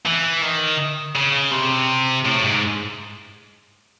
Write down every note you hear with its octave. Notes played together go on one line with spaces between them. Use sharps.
E3
D#3
C#3
C3
A2
G#2